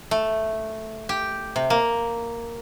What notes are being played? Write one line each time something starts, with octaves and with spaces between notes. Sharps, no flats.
A3
G4
C3
A#3